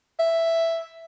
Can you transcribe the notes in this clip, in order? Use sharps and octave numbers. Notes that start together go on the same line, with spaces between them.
E5